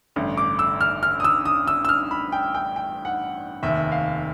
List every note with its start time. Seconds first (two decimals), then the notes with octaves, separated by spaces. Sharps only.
0.16 A1 G2 D3
0.37 D6
0.59 E6
0.81 F6
1.03 F6
1.20 D#6
1.24 E6
1.46 D#6
1.67 E6
1.85 E6
1.89 F6
2.11 B5
2.32 G5
2.55 G5
2.76 G5
3.05 F#5
3.63 F1 D#2 D#3 E5
3.92 F5